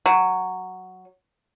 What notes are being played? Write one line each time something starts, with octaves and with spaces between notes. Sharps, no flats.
F#3